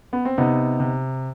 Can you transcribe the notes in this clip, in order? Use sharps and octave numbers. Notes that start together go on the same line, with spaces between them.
B3
C4
C3 B3 D#4
C3